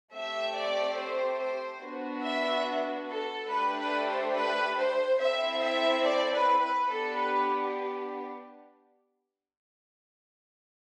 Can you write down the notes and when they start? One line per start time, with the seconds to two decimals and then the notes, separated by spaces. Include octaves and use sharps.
0.13 A3 C4 G4 E5
0.55 D5
0.98 C5
1.40 C5
1.82 B3 D4 F#4
2.24 E5
3.08 A4
3.51 A3 D4 G4 B4
3.79 B4
4.07 C5
4.35 B4
4.77 C5
5.19 C4 E4 A4 E5
5.61 E5
6.04 D5
6.33 B4
6.61 B4
6.88 B3 D4 G4 A4
7.16 B4